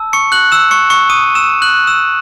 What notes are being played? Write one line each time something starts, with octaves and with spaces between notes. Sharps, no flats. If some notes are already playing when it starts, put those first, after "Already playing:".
Already playing: A5 E6
C#6 C#7
F#6 F#7
E6 E7
C#6 C#7
C#6 C#7
D#6 D#7
E6 E7
F#6 F#7
E6 E7